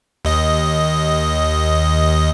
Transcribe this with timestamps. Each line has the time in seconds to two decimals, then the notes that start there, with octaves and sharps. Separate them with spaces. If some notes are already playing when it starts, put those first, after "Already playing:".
0.25 D#2 D#5